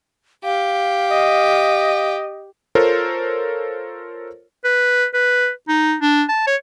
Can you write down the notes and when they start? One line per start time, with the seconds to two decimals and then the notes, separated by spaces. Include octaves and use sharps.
0.44 G4 F5
1.11 D#5
2.75 F4 A4 A#4 C5 C#5
4.64 B4
5.14 B4
5.68 D#4
6.00 D4
6.29 A5
6.47 C#5